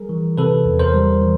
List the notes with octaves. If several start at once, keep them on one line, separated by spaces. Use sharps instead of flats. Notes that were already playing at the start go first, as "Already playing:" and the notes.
Already playing: G3 G#4 A#4
E3
C3 A4 B4
E2
A#4 C5
G3
E3